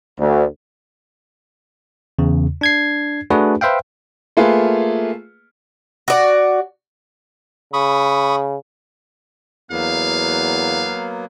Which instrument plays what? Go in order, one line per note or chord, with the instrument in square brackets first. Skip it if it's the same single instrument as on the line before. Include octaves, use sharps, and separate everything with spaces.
[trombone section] D2
[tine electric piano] E2 C#3
D4 G#6 C7
A3 D4 F#4 G#4 B4
B4 C5 E5 F5 G5
[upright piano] A3 A#3 F4 G#4 B4
[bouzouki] F#4 D5
[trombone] C#3 [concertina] B5 C#6 D#6
[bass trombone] E2 [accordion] F#3 A#3 B3 [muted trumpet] F5